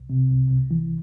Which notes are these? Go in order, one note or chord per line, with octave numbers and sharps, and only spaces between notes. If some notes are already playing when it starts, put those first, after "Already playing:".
Already playing: C2
C3
C2
C2
E3